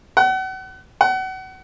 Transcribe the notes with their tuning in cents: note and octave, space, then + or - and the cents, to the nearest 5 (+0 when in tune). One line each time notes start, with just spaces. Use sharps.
F#5 +35
F#5 +30